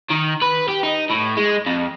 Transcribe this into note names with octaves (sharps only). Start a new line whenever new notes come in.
D#3
B4
G4
D#4
A2
G#3
F2